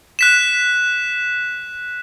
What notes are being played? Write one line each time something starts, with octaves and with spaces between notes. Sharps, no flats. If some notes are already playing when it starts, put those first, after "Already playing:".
F#6 B6 E7